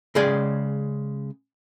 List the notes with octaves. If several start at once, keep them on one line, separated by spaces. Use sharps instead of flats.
C#3 G#3 G#4 D5 G5